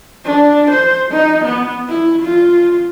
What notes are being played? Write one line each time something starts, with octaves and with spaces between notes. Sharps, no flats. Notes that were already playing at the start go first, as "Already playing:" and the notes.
D4
C5
D#4
B3
E4
F4